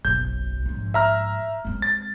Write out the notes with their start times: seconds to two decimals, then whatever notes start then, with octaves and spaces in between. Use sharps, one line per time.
0.05 F#1 B1 G6
0.65 A#1 G#2
0.94 E5 A#5 F6
1.65 G#3 C4
1.82 A6